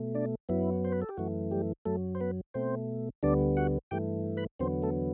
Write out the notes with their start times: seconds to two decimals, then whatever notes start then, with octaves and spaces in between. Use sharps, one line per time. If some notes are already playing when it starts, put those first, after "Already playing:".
Already playing: B2 A3
0.15 D4 D5
0.49 F#2 F#3 B3 E4
0.85 C5
0.92 B4
1.02 A4
1.09 G4
1.17 F#2 E3 A3 F#4
1.51 G3 G4
1.86 F#2 F#3 A3 A4
2.15 C5
2.21 B3 B4
2.54 B2 A3 C4 C5
3.23 D2 D3 G3 B3 D4 D5
3.57 F#4 F#5
3.91 G2 E3 A3 G4 G5
4.37 B4 B5
4.60 E2 D3 F#3 B3 C4 C5
4.82 A3 A4